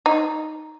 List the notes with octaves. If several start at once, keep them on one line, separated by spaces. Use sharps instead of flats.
D#4